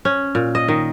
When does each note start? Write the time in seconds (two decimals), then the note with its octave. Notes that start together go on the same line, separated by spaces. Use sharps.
0.05 C#4
0.35 A#2
0.55 D#5
0.68 D#3